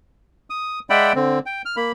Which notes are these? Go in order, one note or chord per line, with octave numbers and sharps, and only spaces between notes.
D#6
G#3 D5 E5 F#5 G5 B5
D3 C4
G5
F6
A#3 B5